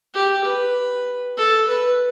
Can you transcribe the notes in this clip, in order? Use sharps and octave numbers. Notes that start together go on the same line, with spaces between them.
G4
B4
A4
B4